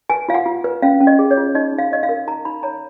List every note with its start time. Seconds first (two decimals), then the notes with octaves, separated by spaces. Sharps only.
0.10 B4 G#5
0.29 F4 F5
0.34 F#5
0.46 F4
0.64 B4
0.82 C#4 F5
1.00 C#4
1.07 D#5
1.19 G#4
1.31 C#5
1.37 F4
1.55 D#4 D#5
1.73 D#4
1.79 F5
1.91 C#5 D#5
2.03 F5
2.09 A#4
2.27 D#4 A#5
2.45 D#4 B5
2.63 C#5 A#5